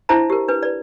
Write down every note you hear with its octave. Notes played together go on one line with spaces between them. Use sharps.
D4 E4 C5 E5 A5 A#5
G4 A#4
D4 B4
B4 D5